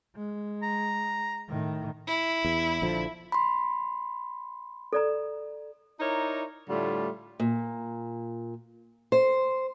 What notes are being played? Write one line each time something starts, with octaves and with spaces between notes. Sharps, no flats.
G#3
A#5
A2 D#3
E4
E2
A#1 D3 F3
B5 C6
A4 D5 A#5
D#4 E4 A#4 C#5 D5
A2 D3 G3 A3 F4
A#2
C5